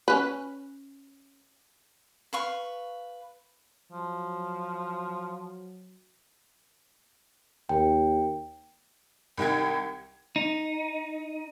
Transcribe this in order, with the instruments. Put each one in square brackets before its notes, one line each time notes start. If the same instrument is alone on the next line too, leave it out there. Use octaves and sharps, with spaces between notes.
[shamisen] C#4 B4
[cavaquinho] B4 F5 C#6
[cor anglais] F3 [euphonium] F#3
[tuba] D#2 [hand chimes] G5
[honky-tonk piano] C2 D#3 G5 G#6
[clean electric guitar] D#4